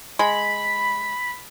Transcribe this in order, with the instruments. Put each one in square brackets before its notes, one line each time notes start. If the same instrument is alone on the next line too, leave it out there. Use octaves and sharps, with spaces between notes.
[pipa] G#3 [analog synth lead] B5